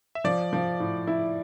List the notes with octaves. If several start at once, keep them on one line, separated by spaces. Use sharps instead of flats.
E5
F3 D5
F3
A2
E4